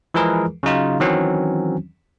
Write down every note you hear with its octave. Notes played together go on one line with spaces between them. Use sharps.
E3 F3 G#3 G#4 A#4 B4
C#3 F#3 D#4 F4
D#3 E3 F#3 C4 C#4